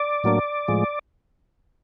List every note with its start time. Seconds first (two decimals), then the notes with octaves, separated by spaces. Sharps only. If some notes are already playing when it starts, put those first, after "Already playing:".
Already playing: D5
0.24 A2 F#3 A#3 D4
0.68 A2 F3 G#3